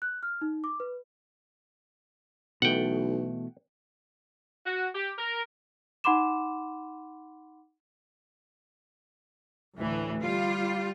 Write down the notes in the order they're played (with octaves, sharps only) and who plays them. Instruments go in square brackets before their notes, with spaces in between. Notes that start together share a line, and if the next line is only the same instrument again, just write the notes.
[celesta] F#6
F6
D#4
D6
B4
[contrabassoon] B1 [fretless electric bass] B2 E3 A3 [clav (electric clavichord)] F#5 G5
[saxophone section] F#4
G4
A#4
[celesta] D#4 F#5 B5 C6 D6 E7
[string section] D2 A2 E3
G3 F4